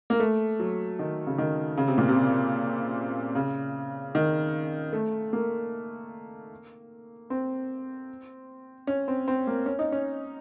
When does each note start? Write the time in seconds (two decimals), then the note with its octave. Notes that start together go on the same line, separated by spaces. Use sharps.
0.10 A#3
0.20 A3
0.60 F#3
0.99 D#3
1.27 C#3
1.38 D#3
1.77 C#3
1.88 C3
1.98 A#2
2.09 C3
3.35 C#3
4.15 D#3
4.93 A3
5.33 A#3
7.30 C4
8.87 C#4
9.08 C4
9.28 C4
9.47 A#3
9.66 C#4
9.79 D#4
9.92 C#4